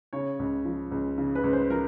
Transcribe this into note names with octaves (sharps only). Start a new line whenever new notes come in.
C#3 C#5
C#2
F3
C#2
C#3
B4
C#2
C5
F3 A#4